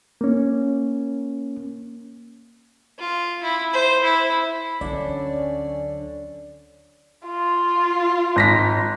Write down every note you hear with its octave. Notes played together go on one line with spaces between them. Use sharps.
A#3 C#4
F4
E4
C5
E4
D2 D3 F#3 C#4 D5
F4
G#1 A#6 B6